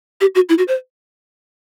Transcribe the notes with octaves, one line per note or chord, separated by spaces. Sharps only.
G4
F#4
E4
F#4
C5